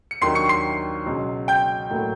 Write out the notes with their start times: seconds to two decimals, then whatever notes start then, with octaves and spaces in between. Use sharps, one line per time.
0.11 C#7
0.21 D#2 D#3 F#3 A#3 D4 C6 C7
0.35 C#6 C#7
0.49 C6 C7
1.06 C#2 B2 F#3
1.48 G5 G6
1.91 A2 F#3 A#3